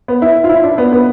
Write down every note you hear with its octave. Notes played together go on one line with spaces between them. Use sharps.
B3
E4
F4
E4
D4
B3
B3